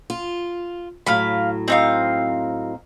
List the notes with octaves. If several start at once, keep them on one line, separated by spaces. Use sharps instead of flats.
F4
A2 F#3 F5 B5
C4 D#4 F5